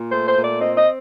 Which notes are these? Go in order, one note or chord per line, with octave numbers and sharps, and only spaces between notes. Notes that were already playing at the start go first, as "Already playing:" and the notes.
Already playing: A#2
A3 C5
C5
A#2
D5
C4 D#5
D#5